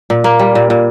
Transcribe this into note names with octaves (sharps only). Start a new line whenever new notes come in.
A#2
A#3
G3
A#2
A#2